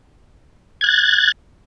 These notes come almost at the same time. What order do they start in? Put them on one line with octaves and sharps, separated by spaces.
G#6 F#6 A6